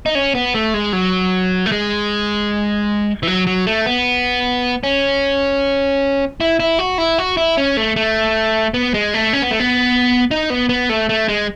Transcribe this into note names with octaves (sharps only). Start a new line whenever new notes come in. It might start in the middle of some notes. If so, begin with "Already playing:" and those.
D#4
C#4
B3
A3
G#3
F#3
A3
G#3
E3
F#3
F#3
A3
B3
C#4
E4
E4
F#4
E4
F#4
E4
C#4
A3
A3
B3
G#3
A3
C#4
B3
A3
B3
D#4
B3
B3
A3
A3
G#3